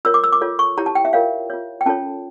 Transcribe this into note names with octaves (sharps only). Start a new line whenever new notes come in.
F4 A#4 C#5 E6
D6
E6
D6
F4 A4 C#5
C#6
E4 G4 C#5 A#5
A5
G5
E5
F4 A#4 C#5 F5
F4 C#5
G5
C#4 F4 A4 C#5 A5